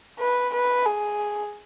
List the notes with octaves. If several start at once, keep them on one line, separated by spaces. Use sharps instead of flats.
B4
B4
G#4